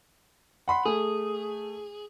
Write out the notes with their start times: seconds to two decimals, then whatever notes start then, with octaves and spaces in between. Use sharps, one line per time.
0.68 F#5 B5 C6
0.86 A3 G#4